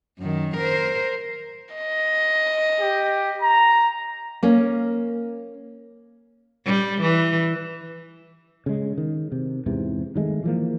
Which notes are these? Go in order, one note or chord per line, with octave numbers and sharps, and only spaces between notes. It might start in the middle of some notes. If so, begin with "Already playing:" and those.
F#2 D#3
A#4 C5
D#5
G4
A#5
A#3 C#4
G3
E3
C#3 G#3
D#3
C3
E2 G#2 C3 E3
D#3 F#3 G#3 A3
E3 F3 A#3